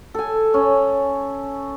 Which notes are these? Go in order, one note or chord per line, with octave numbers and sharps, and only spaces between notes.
A4 G#5
C#4